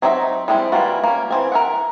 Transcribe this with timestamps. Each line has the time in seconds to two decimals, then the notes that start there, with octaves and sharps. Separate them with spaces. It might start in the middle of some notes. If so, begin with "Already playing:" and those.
0.02 F#3 C4 D4 D#4 E5
0.48 G3 G#3 C4 D#4 E4
0.72 E3 G3 A#3 F4 F#4
1.03 A#3 C#4
1.30 E3 C4 G#5
1.52 A#4 E5 F#5